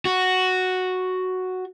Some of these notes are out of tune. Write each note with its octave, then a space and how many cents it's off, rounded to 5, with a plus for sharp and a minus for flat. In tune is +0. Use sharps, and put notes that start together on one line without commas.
F#4 +0